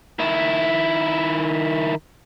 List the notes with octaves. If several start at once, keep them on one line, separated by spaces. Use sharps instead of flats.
D#3 E4